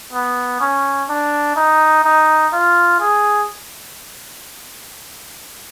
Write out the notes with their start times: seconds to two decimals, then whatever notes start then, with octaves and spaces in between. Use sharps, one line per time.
0.13 B3
0.61 C#4
1.09 D4
1.56 D#4
2.04 D#4
2.53 F4
3.00 G#4